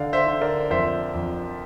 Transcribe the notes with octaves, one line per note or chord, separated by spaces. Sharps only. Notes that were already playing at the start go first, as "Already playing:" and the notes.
Already playing: D3 D5 F5
C5 E5
D3
A#4 D5
F2 C5 E5
F2